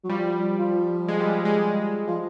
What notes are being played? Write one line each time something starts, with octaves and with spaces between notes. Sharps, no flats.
F#3
F3 G3
F3
G#3
G3
G#3
G#3
G#3
F3